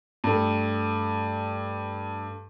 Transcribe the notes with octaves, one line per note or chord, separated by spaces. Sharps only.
G2 A3